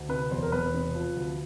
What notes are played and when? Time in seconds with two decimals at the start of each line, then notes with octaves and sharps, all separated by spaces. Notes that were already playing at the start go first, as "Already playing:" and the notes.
Already playing: D2
0.09 C3 B4
0.31 E1 C5
0.43 A#4
0.52 E1 B4
0.74 C3
0.95 F3
1.17 D2